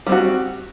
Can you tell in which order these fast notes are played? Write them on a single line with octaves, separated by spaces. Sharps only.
G3 C4 F#4